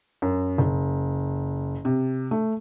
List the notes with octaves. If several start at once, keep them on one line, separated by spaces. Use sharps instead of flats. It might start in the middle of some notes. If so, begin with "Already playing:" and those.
F#2
F#1
C3
A3